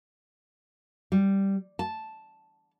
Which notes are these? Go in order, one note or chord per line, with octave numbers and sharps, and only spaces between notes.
G3
A5